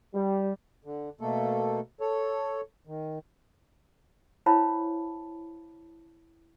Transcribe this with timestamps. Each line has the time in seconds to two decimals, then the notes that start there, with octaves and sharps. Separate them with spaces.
0.15 G3
0.85 D3
1.21 B2 A3 A#3 A4
2.00 A4 C#5
2.87 D#3
4.46 E4 C5 C#5 F5 A5 B5